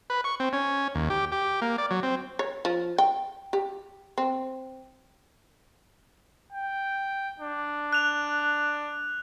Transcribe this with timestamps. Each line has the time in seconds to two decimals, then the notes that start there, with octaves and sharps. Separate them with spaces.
0.10 B4
0.24 C#6
0.40 C4
0.53 C#4
0.95 D#2
1.10 G4
1.32 G4
1.62 A#3
1.78 D5
1.91 F#3
2.03 C4
2.39 C#5
2.65 F3
2.98 G5
3.53 G4
4.18 C4
6.52 G5
7.40 D4
7.93 F#6 F7